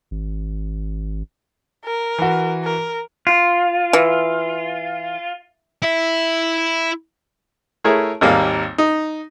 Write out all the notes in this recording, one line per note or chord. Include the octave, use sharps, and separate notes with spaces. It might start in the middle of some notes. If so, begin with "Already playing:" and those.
G#1
A#4
E3 F#4
A#4
F4
E3
E4 E5
A3 E4 G#4 A#4 C#5
G#1 D#2 G3 A#3
D#4